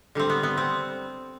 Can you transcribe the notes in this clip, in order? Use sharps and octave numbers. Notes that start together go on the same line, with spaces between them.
D3 G3 C4
B3
B3
C4